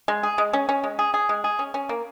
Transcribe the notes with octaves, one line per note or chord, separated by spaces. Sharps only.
G#3
G#4
G#3
C#4
C#4
G#3
G#4
G#4
G#3
G#4
C#4
C#4
A#3